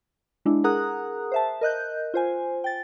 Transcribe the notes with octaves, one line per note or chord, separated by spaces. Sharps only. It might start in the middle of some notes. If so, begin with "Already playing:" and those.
G#3 D4 E4
G#4 A#4 F#5 A#5 D#6 F#6
C5 E5 A5
A#4 D#5 F#6 G6
F4 C5 G#5
G5 A6